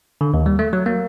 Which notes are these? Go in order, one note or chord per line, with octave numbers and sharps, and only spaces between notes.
D3
D#2
G3
A3
F#3
A#3